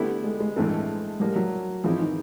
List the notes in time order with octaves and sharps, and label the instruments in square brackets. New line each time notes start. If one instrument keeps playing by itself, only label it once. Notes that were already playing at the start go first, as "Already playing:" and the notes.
Already playing: [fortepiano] D3 G3 B3 E4 G4 [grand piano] A3
[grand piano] G#3
G#3
[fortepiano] A1 G2 E3 A3 C4 [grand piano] G#3
[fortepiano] A2 F3 A#3 [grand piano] G3
[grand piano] F#3
[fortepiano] G#2 E3 G#3 C4 E4 [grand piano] F3
[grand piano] D#3